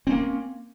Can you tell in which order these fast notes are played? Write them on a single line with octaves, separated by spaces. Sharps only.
C4 C#4 A#3